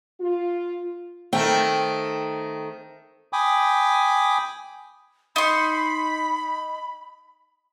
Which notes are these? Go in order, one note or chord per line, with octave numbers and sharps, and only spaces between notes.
F4
D#3 A3 C4 G5
G5 G#5 B5 D6 D#6
D#4 B5 C6